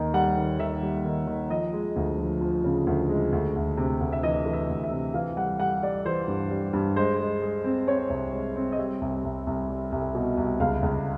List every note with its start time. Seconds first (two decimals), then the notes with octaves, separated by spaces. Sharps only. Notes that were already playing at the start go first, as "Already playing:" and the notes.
Already playing: D#2 D#3
0.14 G3 F#5
0.36 D#3
0.59 D#3 E5
0.82 G3
1.05 D#3
1.27 D#3
1.50 F3 D#5
1.73 G#3
1.96 D2
2.18 F3
2.41 F3
2.64 C#3
2.87 D2
3.09 G#3
3.32 D2
3.56 D2
3.77 C3
4.00 D2
4.12 E5
4.23 E3 D#5
4.46 E3
4.53 E5
4.69 D2
4.84 E5
4.91 C3
5.14 E3 F5
5.37 G3 F#5
5.60 G3 F#5
5.82 G3 D5
6.05 E3 C5
6.28 G2
6.50 G3
6.73 G2
6.96 G#3 C5
7.19 G#3
7.42 G#3
7.64 C4
7.87 C4 C#5
8.10 C2
8.33 G#3
8.56 C4
8.72 D#5
8.78 G3 E5
9.01 C2
9.24 C2
9.47 C2
9.69 G3
9.92 C2
10.15 B2
10.37 C2
10.60 C#2 F5
10.82 C#2